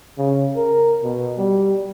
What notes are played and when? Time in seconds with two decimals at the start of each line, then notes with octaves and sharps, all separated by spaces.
0.18 C#3
0.56 A#4
1.03 B2
1.38 G3